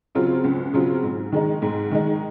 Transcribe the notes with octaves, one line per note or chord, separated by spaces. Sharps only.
C#3 F#3 C4 F4
C#2
C#3 F#3 C4 F4
G#2
D#3 G#3 D#4
G#2
D#3 G#3 D#4